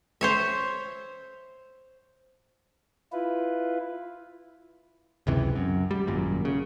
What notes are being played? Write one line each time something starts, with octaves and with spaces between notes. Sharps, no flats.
C5 C#5 E5
E4 F4 B4
F#1 C#2 C3 E3
F#2
G3
G#1 F#2 A#2
C#3